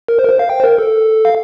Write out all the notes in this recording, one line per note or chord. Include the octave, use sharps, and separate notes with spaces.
A#4
C5
A#4
C5
F5
G5
C5
A#4
A4
F5